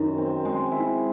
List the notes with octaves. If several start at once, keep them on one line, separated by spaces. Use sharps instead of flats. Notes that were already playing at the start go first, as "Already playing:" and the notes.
Already playing: F#2 D#3
C4
G#3
E4